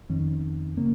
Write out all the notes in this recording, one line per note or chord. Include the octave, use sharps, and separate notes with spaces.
F2 D#3 C#4
C#3 A#3 C#4